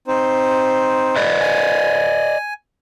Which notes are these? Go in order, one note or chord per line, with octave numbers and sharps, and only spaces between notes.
C4 D#4 C5
B4 D5 D#5
G#5